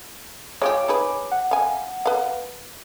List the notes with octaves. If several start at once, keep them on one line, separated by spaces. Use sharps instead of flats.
G#3 F4 G4 C#5 D6
D#4 G#4 B4
F#5
F5 G#5
B4 F5